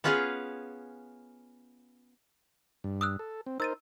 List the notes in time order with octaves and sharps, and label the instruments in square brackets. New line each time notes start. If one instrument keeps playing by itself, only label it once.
[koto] B3 C#4 F4 G#4 B4 F5
[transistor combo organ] G2
[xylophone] D#6 E6 F#6
[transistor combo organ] A4
C4
[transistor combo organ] D#4 A#4 C5 [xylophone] E6 A6 D#7